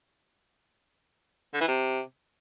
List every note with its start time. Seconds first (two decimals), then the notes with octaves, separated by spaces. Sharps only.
1.54 D3
1.61 E3
1.68 C3